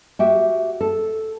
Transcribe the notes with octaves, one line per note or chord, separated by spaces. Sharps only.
F#4 G4 E5
A4